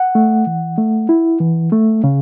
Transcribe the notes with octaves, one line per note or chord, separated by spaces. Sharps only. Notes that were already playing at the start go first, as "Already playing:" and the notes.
Already playing: F#5
A3
E3
A3
E4
E3
A3
C#3